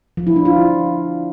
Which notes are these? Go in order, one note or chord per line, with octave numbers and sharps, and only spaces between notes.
F3
E4
D4
F4